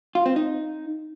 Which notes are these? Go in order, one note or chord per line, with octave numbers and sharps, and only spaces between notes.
F4
C4
D#4